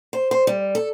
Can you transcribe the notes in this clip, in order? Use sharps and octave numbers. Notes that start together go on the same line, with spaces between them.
C5
C5
G3
A4